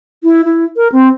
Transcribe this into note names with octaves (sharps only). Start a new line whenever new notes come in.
E4
E4
A#4
C4